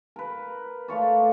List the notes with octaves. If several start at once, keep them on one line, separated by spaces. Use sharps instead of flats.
A#4 B4
A3 F4 C#5 D5